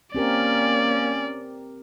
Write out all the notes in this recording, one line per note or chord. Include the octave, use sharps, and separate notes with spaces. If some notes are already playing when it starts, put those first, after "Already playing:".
A#3 C4 C#4 G4 A#4 D5